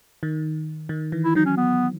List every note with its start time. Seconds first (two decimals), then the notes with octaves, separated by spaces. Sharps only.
0.23 D#3
0.89 D#3
1.12 E3
1.24 E4
1.35 F#3 D#4
1.46 C#4
1.57 B3